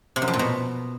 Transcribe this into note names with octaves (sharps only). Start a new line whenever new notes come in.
C3
F#2
F2
A#2
B2